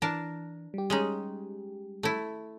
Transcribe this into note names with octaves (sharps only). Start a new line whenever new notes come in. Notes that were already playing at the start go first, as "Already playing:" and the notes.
E3 D4 A#4 A5
G3 G4
G#3 C#4 D#4
A3 E4